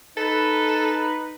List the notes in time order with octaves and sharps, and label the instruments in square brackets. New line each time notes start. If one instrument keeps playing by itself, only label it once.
[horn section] D#4 B4 [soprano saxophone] A4